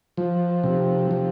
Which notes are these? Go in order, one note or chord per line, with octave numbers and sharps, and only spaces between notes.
F3
C3
F3